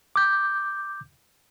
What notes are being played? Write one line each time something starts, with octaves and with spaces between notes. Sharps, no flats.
D6 G6